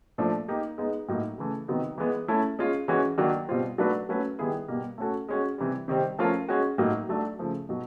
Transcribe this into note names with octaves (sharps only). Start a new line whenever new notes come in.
A#2 F3 A3 D4
A#3 D#4 G4
G#3 B3 D#4
A2 F#3 A#3 D#4
C#3 E3 A3
C3 D#3 F#3 B3 D#4
E3 G#3 B3
A3 C#4 E4 A4
G#3 C#4 F4
E3 G#3 C#4 F#4
D#3 F#3 A#3 D4 F#4
B2 G3 C4 F4
F#3 A3 D4 F#4 B4
F#3 A3 C#4 F#4 B4
D#3 G3 B3 E4 G#4
B2 G3 A#3
A3 C#4 F#4 A4
G#3 C#4 F#4
C3 E3 G3
C3 D#3 G3 C4
F3 A3 C#4 F4 A#4
G#3 C#4 F#4
A2 F#3 A#3 D#4
F#3 A3 D4
C#3 F3 A3
B2 F#3